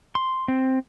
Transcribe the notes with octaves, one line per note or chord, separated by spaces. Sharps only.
C6
C4